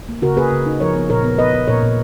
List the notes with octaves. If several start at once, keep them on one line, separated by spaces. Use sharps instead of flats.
A#3
C#3 F#4 A#4
A#3 G#4 B4
C#3
D#4
F3 A#4 C#5
B3
A#2 A#4 C#5
B3
B3 B4 D#5
B3
A#2 A#4 C#5
A#2